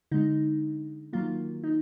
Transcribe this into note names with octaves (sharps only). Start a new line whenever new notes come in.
D3 G#3 D#4
D#3 F#3 A#3 F4
D#4